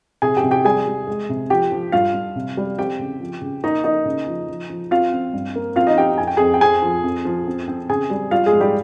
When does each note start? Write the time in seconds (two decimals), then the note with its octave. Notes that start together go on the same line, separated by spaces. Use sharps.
0.22 C3 G#4 G#5
0.37 G4 G5
0.44 C3
0.51 G4 G5
0.65 G3 G#4 G#5
0.87 G3
1.07 G#3
1.29 C3
1.50 F3 G4 G5
1.72 F3
1.92 G2 F4 F5
2.14 G2
2.36 C3
2.57 G3
2.78 C4 G4 G5
2.99 C#3
3.20 F3
3.42 C#3
3.63 A#3 D#4 D#5
3.84 A#3 D#4 D#5
4.06 C#3
4.27 F3
4.48 F3
4.70 F3
4.91 C4 F4 F5
5.13 C4
5.34 G2
5.56 A#3
5.76 C4 F4 F5
5.87 D#4 D#5
5.98 C4 G4 G5
6.18 F2 G#5
6.27 G5
6.37 F2 G#4 G#5
6.54 G5
6.61 C4 G#4 G#5
6.82 F3
7.04 F2
7.25 F3
7.47 C4
7.68 C4
7.90 C#3 G#4 G#5
8.10 G3
8.31 G3 F4 F5
8.46 G#3 G#4
8.53 G#2
8.60 G3 G4